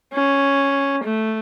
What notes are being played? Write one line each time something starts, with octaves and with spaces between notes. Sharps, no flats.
C#4
A3